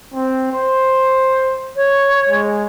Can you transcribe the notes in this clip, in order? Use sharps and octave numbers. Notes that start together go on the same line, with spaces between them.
C4
C5
C#5
G#3